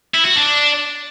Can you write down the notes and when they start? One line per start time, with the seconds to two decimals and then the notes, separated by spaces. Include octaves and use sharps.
0.14 E4
0.25 F#4
0.36 D4